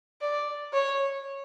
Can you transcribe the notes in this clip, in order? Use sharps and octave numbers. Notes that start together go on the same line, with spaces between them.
D5
C#5